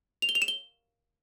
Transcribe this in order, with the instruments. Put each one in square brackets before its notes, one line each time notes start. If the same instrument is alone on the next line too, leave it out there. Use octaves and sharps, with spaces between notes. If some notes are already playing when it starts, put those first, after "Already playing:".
[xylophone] F7
G7
F7
E7
G7